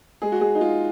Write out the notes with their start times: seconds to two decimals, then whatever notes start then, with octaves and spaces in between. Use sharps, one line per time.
0.22 G#3 G#4
0.32 F#4
0.41 G#3 G#4
0.55 D#4
0.61 G#3 F4